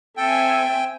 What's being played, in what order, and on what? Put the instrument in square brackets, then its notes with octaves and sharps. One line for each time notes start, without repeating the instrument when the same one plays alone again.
[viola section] C4 E5 G#5 [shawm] A4 [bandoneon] G5